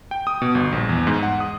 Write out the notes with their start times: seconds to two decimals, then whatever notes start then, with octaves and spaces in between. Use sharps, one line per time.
0.11 G5
0.27 D#6
0.42 B2
0.55 G1
0.72 A#1
0.89 E2
1.07 G#2
1.23 F#5
1.40 D#6